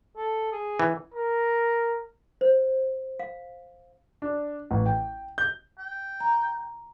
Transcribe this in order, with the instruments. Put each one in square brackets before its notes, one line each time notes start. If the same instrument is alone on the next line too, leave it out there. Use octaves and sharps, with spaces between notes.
[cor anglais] A4
G#4
[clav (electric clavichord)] E3
[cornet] A#4
[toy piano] C5
F5
[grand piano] D4
A1
G5
G6
[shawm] G5
[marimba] A#5